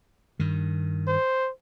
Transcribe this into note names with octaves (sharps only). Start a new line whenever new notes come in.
G2 D#3
C5